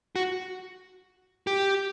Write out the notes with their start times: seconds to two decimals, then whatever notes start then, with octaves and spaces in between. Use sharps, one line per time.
0.16 F#4
1.47 G4